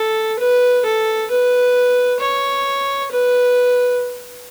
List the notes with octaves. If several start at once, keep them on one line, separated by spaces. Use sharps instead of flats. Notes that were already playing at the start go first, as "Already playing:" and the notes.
Already playing: A4
B4
A4
B4
C#5
B4